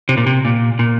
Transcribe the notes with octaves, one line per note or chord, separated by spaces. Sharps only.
C3
A#2
C3
A#2
A#2